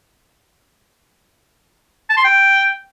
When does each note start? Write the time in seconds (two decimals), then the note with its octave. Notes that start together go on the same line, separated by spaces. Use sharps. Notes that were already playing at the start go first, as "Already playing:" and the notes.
2.10 A5
2.17 C6
2.24 G5